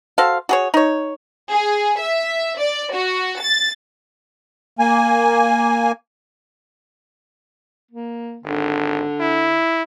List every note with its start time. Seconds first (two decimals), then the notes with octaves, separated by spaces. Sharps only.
0.18 F#4 A4 C5 F5
0.49 F#4 G#4 C#5
0.74 D#4 C#5
1.50 G#4
1.99 E5
2.59 D5
2.93 F#4
3.40 A6
4.79 A#3 G#5
7.91 A#3
8.45 G#1 D3
9.20 E4